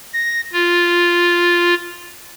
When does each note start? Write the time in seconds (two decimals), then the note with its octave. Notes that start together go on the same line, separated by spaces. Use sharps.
0.13 A#6
0.53 F4